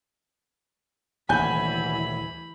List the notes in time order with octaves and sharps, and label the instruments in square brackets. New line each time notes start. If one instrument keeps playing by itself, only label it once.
[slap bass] D#1 D2 C3 [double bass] E3 E4 [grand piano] G#5 G6 [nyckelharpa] B5